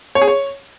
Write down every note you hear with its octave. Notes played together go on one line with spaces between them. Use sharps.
C#5
G#4
C#5